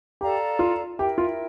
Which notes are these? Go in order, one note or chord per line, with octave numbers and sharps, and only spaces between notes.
G4 A4 D5 F5 A#5
F4
E4 G4 A#4 E5 G5
F4